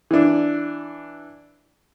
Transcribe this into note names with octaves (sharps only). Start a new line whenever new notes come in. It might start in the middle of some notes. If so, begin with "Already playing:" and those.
E3 D4